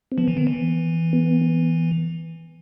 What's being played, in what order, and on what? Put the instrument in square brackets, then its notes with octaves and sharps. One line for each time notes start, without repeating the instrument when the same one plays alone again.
[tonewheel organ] C4
[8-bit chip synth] F3 [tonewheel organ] B3
[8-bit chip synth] E3
D#3
E3
[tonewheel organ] B3